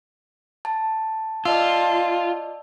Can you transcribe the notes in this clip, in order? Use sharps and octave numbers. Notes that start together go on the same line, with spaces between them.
A5
F4 D5 D#5 A5 E6